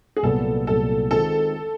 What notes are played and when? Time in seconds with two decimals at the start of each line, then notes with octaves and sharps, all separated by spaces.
0.17 G#4
0.23 C2 A#2 F#3 B3 A4
0.67 C2 A#2 F#3 B3 A4
1.11 D#3 G#3 C4 F4 A4